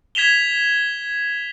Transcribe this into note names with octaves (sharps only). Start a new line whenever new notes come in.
G#6 B6 E7 F7 G7